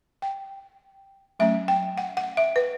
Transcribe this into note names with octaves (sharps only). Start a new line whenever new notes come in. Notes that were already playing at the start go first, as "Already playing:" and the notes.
G5
F#3 A3 C#4 E5
G5
F#5
F#5
E5
B4